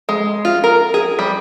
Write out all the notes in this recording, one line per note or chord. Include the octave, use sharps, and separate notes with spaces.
G#3
F4
A#4
G#4
G3